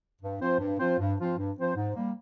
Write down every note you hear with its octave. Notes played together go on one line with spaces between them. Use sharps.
G2
F3 C4 F4 C5
G2
F3 C4 F4 C5
G2
F3 C4 F4 C5
G2
F3 C4 F4 C5
G#2
G3 A#3